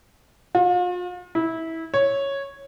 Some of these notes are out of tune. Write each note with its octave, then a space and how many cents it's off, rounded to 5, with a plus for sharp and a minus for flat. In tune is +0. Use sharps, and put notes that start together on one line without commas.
F4 +40
E4 -20
C#5 -5